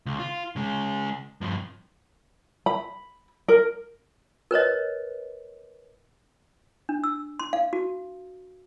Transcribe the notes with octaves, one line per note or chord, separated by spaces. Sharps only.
C#2
F4
C#3 G#3
G2 F3
B5
A#4
A#4 B4 C#5 D#5
D4
E6
C6
F5
F#4